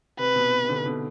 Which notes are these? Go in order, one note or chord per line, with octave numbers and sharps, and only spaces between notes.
C3 B4
B2
C3
B2 D3
B2 D3